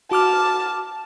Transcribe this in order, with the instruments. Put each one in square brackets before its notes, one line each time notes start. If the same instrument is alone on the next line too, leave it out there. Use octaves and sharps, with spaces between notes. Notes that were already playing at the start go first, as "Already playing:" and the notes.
[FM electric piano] F#4 D6 F6 [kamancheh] A5